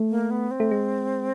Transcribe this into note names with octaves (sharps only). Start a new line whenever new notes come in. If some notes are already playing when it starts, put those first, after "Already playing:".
Already playing: A3
A#3
B3
C4
A3
G#3